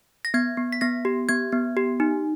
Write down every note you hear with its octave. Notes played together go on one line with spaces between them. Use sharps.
A#6
B3 G#6
B3
B6
B3 A#6
G4
B3 G#6
B3
G4
D#4